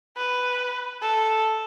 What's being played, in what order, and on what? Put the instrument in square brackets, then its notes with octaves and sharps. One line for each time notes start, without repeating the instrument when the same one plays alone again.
[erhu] B4
A4